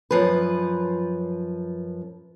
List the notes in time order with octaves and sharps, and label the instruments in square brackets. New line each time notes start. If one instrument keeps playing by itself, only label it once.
[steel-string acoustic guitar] F#2 F3 B4